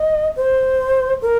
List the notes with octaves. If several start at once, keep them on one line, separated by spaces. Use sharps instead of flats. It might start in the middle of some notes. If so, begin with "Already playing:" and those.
Already playing: D#5
C5
A#4